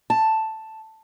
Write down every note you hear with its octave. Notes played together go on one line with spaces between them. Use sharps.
A5